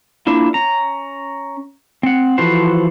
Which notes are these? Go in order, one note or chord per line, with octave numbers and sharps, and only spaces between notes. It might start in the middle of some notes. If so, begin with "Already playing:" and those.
A#3 D4 E4 F4
C#4 A#5
C4 F#5
E3 F3 F#4 A4 C5